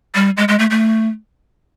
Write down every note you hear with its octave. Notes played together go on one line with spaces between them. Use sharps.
G3
G#3
G#3
A3
A3